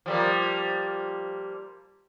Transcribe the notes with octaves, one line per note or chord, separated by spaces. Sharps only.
F3 G3 A#3